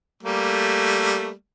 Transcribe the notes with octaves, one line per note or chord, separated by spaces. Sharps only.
G3 A3 A#3